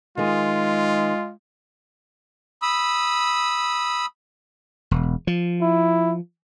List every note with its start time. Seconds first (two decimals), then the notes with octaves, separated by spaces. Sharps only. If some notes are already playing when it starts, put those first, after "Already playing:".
0.18 D#3 G#3 F4 G#4
2.62 B5 D#6 E6
4.91 E1
5.27 F3
5.62 E4